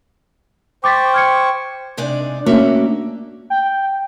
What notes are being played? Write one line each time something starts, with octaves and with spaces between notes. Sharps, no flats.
C5 G5 C#6 D6 A6 B6
F6 G#6 C#7
C3 G#3 D4 D#4 D5 G#5
A3 A#3 C#4 D4 F#4 E5
G5